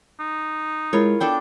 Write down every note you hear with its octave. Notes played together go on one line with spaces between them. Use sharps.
D#4
G#3 E4 F4 A#4 C#5 B5
B3 D4 A4 G5